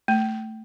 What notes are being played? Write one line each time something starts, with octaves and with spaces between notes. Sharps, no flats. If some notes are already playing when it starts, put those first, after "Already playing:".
A3